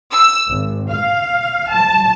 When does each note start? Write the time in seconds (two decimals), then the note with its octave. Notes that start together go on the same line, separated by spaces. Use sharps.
0.11 E6
0.50 G#1
0.90 F5
1.71 A5